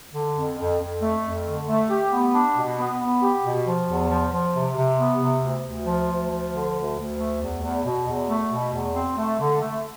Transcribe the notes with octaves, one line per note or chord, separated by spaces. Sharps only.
D3
F2
F2
F2
A3
F2
D3
A3
G4
B3
D4
B2
B3
B3
G4
B2
F3
E2
F3
F3
C3
C3
B3
C3
D2
D2
F3
D2
F3
D3
D2
D2
A3
E2
E2
B2
E2
A3
B2
E2
C4
A3
D3
A3